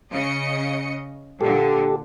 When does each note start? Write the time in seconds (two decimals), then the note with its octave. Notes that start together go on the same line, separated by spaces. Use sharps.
0.11 C#3 D#5 C#7
1.41 A#2 D3 G4 A4